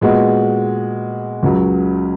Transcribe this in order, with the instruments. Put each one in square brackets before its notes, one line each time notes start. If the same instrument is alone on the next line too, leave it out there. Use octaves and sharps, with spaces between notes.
[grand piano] A#2 G#3 B3 F#4
C#2 C#3 F#3